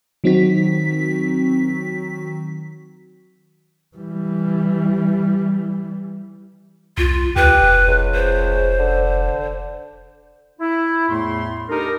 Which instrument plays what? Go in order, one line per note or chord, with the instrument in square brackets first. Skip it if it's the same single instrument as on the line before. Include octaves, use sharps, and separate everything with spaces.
[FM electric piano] D#3 F#3 C4 D#4 F#4 B6
[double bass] E3 G3
[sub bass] C2 [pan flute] F4
[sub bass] D2 [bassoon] G4 [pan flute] B4
[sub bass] F1
[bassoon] C#2
[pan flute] C5
[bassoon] D3
[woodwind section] E4
E2 A2 A3 B5 C6
D4 D#4 G4 A4 A#4